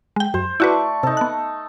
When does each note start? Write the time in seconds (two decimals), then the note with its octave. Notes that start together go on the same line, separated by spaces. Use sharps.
0.16 G#3 G5
0.34 F#2 C5
0.60 A3 E4 F#4 B4 D5 C#6
1.03 C3 D#4 A4
1.17 B3 F#6